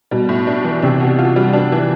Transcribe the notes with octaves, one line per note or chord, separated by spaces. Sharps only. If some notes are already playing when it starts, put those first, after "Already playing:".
B2 G3
A2
D4
E3
C3 D4
B2
F4
G3
D4
E3